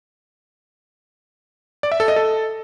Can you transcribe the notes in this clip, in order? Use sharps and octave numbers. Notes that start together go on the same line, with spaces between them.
D5
E5
A4
D#5
A4